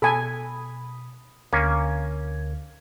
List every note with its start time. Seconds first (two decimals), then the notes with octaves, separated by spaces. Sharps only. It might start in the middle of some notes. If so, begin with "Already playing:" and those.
0.02 B2 A4 G#5 B5 D#6
1.53 D2 D3 A#3 C#4 G#6